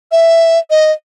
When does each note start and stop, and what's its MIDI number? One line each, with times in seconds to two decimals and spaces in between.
0.12 0.59 76
0.70 0.92 75